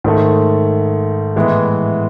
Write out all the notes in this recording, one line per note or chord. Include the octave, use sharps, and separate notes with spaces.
G#2 D#3 A3
A2 E3 G#3 B3